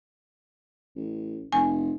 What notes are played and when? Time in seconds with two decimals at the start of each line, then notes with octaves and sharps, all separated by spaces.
0.96 A1
1.53 F1 G#5